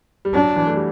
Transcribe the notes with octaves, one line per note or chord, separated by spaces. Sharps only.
G3
F#3 D4
E3
A3
G3